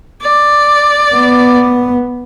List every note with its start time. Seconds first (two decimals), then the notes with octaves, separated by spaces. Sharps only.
0.22 D5
1.15 B3